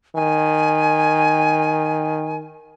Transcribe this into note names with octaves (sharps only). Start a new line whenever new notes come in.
D#3 G#5